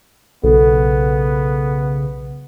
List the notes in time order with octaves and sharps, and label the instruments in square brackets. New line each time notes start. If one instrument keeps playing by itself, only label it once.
[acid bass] B1 [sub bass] C#3 [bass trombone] B3 [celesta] A4